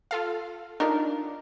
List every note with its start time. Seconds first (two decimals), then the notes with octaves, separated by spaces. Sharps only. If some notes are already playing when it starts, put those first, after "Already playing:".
0.11 F4 A4 F5
0.80 D4 D#4 F4 A#4